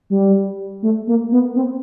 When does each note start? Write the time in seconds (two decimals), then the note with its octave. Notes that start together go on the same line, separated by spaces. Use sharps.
0.10 G3
0.83 A3
1.07 A#3
1.32 B3
1.56 C4